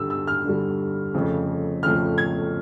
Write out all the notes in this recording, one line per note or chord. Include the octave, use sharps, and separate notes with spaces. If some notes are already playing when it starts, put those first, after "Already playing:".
Already playing: G2 D3 G3 E6
E6
F6
G2 D3 G3
F2 C#3 F3 A3
F2 C#3 F3 A3 F6
G#6